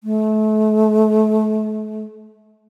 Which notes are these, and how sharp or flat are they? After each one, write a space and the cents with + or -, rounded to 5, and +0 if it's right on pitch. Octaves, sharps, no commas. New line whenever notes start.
A3 -35